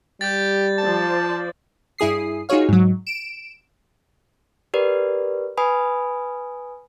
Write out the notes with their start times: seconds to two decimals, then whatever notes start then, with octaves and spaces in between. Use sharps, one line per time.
0.21 G3 G4 G6 A6
0.78 F3 C5 D5 A5
1.98 G2 E4 G#4 D#6 C7
2.49 D#4 F4 F#4 G#4 C#5 F5
2.69 G#2 F#3
3.06 D7 E7
4.74 G4 A#4 B4 D5
5.57 B4 G#5 B5 D#6